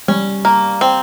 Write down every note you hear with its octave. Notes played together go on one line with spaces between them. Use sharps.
G3 C#4
A#3
C4